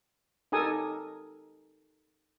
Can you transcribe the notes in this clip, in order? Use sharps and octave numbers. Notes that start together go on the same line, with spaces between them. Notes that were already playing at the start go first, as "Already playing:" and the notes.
D#4 G4 A4 A#4 G#5 D#6